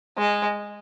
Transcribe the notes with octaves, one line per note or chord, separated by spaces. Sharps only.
G#3